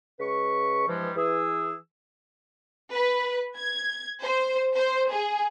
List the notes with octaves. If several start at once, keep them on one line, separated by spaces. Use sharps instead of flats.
C#3 G#3 B4 C#6
G2 E3 F3 G3 G#3
E3 G#4 E6
B4
G#6
C5
C5
G#4